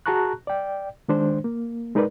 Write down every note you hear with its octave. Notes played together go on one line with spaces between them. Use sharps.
F#4 G#4 A5 A#5 C#6 F#6
D5 G5
D#3 G#3 D4 C5
A#3
G#3 D#4 A#4 B4 D5